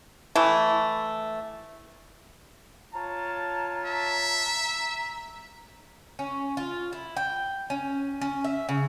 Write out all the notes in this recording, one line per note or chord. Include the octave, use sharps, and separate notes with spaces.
E3 A3
F4 C#5 A5 A#5
E5
C#4
F4
E4
G5
C#4
C#4
E5
C#3